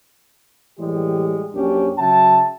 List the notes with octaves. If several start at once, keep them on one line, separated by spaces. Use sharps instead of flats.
A2 E3 G3 G#3 G4
A#1 F#2 C#4 D4 G4
C#3 F#3 E5 G5 A5